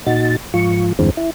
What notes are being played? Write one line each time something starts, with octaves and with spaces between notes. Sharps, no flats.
A#2 D#4 F#4 A6
G#2 F3 F4 C#6
E2 G2 D3 E3 G#3 C4
E4